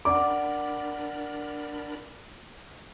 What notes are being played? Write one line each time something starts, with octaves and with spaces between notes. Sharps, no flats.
D4 A#4 D5 F#5 B5 D6